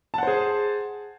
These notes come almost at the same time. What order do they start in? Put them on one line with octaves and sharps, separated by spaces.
A5 F#5 C5 G#4